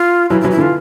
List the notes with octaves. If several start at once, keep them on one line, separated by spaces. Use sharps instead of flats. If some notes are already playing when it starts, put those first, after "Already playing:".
Already playing: F4
E3 F#3 E4
E4
E3 F#3
E4
D3 E3
F4